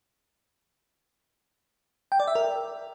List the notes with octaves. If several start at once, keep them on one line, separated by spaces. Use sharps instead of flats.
G5
D5
E5
A#4